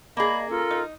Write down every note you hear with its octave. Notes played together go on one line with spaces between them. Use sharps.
A#3 G#4 D5 D#5 F5 B5
C#4 F4 A4 A#4
D#4